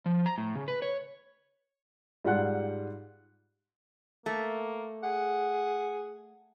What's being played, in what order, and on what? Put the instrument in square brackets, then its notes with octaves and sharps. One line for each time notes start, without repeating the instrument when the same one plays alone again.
[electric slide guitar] F3
A#5
A2
C#3
B4
C#5
[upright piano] G#2 G3 F4 F#5 F#6
[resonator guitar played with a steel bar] A3 [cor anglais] A#3
[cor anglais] G#4 [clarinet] F#5